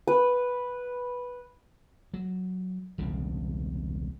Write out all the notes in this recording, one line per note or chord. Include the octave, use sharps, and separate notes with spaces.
B4
F#3
E1 C2 C#3